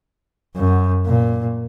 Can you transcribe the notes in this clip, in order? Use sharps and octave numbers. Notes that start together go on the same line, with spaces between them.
F#2
A#2